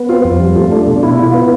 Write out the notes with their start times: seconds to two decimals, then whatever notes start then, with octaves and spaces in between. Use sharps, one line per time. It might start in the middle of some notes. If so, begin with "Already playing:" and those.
Already playing: B3
0.09 C4 F4
0.24 F2
0.40 G3
0.56 A3 F4
0.72 D4
0.87 B2
1.03 E4 F4
1.19 F4
1.34 B3